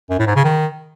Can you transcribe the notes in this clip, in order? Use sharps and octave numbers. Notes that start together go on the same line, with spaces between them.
F#2
A2
G#2
C#3
D#3